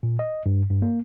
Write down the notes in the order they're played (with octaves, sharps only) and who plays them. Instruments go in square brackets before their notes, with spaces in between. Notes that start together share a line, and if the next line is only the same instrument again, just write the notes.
[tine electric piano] A#2
D#5
G2
G2
A#3